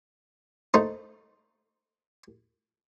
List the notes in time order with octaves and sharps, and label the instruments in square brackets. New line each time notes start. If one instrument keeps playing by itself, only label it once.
[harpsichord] A3 D#4 C5